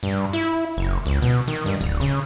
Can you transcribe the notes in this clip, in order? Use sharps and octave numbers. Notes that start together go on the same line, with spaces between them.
G2
E4
F#1
C#2
B2
D#3
G2
D1
C#3